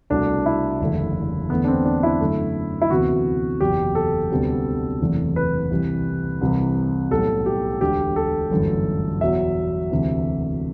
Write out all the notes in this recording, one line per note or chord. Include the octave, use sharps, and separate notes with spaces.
C2 B2 A3 D4
E4
F#1 E2 D3 A3
E2 D3 A3 B3
D4
C4
D4
E4
F#2 D3 A3
E4
D2 C3 E3 B3 F#4
F#1 E2 B2 G4
A4
D2 C3 G3 B3
F#1 E2 C3 E3 A3
B4
C2 C3 E3 G3
C2 C3 E3
B1 A2 G3 B3 A4
G4
E1 D2 D3 G4
A4
G1 F#2 E3 A3
E2 B2 F#3 B3 E5
E1 D2 C3 E3